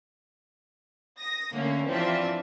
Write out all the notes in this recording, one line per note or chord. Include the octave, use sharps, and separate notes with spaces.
D#6 A#6
D3 A3 A#3 C#4
E3 F3 C4 D4 F4 E5